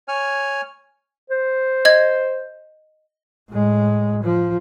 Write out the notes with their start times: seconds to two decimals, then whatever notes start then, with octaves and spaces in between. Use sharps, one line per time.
0.08 C#5 G#5 F6
1.30 C5
1.85 D#5 G#6
3.49 A2 G#3
4.23 F3